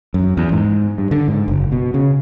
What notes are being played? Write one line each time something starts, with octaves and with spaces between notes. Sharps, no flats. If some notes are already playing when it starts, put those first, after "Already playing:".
F#2
E2
G#2
G2
D3
G#2
F#1
B2
C#3